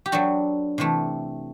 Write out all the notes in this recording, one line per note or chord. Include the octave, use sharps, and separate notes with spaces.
G4
F#3 B3 D4 F#4 A4
C3 E3 A3